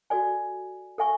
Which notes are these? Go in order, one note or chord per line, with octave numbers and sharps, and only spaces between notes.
F#4 A4 D5 G#5
A4 E5 G#5 C#6